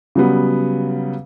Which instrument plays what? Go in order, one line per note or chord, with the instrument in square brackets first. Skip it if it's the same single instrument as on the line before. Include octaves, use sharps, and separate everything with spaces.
[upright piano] C#3 F#3 G3 B3